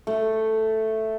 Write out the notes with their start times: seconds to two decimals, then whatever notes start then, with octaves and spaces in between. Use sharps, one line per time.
0.07 A3